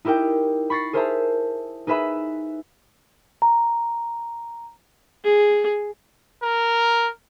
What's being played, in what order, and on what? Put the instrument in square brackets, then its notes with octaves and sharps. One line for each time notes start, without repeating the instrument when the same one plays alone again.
[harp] D#4 E4 G4 A#4 G5
B5 C#6 A6 A#6 C7
G#4 A#4 C5 E5 A5 A#5
D#4 G#4 B4 E5 B5
[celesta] A#5
[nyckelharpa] G#4
[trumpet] A#4